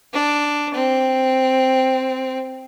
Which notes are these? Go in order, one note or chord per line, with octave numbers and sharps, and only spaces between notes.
D4
C4